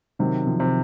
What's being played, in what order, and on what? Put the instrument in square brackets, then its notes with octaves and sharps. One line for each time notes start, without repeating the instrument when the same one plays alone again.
[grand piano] C3 [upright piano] D#3 F#3
[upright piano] F3
[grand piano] C3